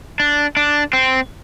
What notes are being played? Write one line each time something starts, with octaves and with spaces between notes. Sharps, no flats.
D4
D4
C4